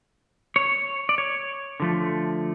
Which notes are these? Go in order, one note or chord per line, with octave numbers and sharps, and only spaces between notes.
C#5
D5
C#5
D3 F3 A3